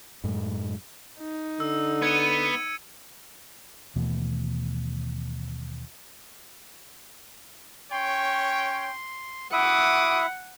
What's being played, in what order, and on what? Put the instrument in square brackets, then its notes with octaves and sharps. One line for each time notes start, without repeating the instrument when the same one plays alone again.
[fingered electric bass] F#2 A2 G#3 A3
[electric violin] D#4
[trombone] D3 [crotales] E6
[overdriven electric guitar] B3 [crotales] G#6 C#7 D#7
[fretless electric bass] D#2 B2 E3 A3
[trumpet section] C#4 C#5 G5 [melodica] C6
[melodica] E4 E5 [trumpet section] F#4 D6 D#6 [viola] F#5